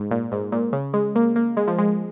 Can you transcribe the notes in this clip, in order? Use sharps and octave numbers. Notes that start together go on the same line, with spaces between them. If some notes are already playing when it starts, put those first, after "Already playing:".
Already playing: G#2
A#2
G#2
A#2
C#3
G#3
A#3
A#3
G#3
F3
G#3